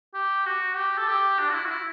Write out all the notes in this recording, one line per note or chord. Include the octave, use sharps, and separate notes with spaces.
G4
F#4
G4
A4
G4
D4
F#4
E4
F#4
E4